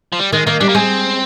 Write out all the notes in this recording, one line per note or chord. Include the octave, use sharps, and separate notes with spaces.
F3
G3
D#3 G#3
D#3 A#3
G3 D4
A#3
G#3 C4